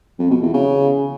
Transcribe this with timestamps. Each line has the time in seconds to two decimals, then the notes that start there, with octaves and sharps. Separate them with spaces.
0.19 F2
0.30 B2
0.42 E2
0.53 C#3